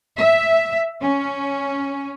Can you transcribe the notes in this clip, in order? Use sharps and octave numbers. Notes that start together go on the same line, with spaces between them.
E5
C#4